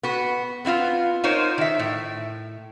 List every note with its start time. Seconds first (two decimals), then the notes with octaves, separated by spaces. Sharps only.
0.03 B3 F#4
0.65 B3 C4 E4 F4
1.24 D#4 F4 A#4 C5 C#5
1.58 D#3 E5
1.79 A2